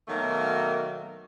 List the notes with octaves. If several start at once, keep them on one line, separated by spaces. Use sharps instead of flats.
B2 D#3 F#3 A3 A#3